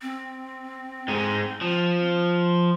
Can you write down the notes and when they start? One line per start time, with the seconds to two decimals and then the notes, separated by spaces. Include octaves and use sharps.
0.02 C4
1.08 G#2 G#3
1.61 F3